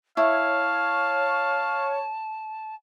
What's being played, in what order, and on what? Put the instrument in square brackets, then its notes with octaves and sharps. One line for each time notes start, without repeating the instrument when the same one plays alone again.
[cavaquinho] E4 [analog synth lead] C#5 [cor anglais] F5 [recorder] A5